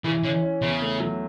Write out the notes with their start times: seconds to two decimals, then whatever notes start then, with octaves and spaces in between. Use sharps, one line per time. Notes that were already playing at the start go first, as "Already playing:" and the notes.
0.04 C#3 E3
0.23 D3 C#4
0.42 C#4
0.62 E2 C#3
0.82 A3
1.00 F#3